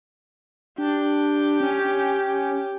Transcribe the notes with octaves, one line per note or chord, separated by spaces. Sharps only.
D4 G4
C#4